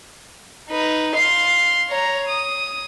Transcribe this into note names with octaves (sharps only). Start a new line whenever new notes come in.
D#4 B4
F5 C6
C#5 A#5
D#6